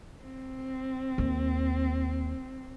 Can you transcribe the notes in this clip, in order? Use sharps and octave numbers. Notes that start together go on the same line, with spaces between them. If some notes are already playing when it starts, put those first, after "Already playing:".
C4
D#2